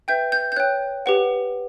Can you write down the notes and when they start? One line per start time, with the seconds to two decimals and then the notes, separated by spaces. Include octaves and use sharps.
0.08 B4 E5 G5 G6
0.32 G6
0.52 G6
0.56 C#5 G5 F#6
1.06 G4 B4 F#5